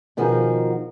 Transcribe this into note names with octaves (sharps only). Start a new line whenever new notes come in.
B2 D#3 F3 F#4 G#4